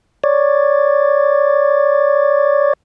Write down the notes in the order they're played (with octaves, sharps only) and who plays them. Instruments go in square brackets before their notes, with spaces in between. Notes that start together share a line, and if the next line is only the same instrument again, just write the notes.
[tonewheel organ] C#5 D5